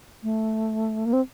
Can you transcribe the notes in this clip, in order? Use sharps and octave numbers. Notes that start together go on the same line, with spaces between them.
A3
A#3
C4